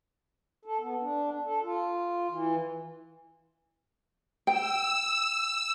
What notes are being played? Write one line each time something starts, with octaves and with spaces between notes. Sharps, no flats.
A4
B3
D4
A4
F4
E3
G5 E6